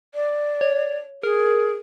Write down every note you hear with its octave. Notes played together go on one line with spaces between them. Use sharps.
D5
C#5
G#4 A#4